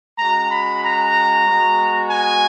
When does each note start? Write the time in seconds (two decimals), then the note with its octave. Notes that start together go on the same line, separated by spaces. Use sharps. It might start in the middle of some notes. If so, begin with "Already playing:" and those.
0.18 G#3 C#4 F#4 A#5
0.50 B5
0.83 A#5
1.46 G#3 B3 F#4
2.11 G#5